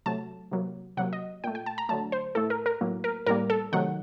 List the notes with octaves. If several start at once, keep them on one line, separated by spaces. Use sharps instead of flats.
C3 F#3 A3 A5
C3 F#3 A#3
C3 F#3 A#3 F#5
D#5
A#2 A3 G5
G5
A5
A#5
D3 F#3 A3 A5
C5
A2 A3 A4
A#4
A#4
A2 F#3 A#3
A#4
A2 G3 A#3 A#4
A4
C3 D#3 F#3 A3 F#5